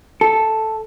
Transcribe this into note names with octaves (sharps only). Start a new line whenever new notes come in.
A4